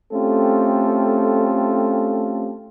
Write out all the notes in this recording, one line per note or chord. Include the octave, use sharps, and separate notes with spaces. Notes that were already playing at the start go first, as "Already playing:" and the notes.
A3 C4 C#4 F4 G4 A4